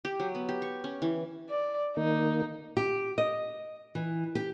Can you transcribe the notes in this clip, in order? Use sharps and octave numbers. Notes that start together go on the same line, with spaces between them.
G4
F#3
B3
G4
C#6
C#4
E3
D5
D#3 A#3 D#4
G4
D#5
E3
G4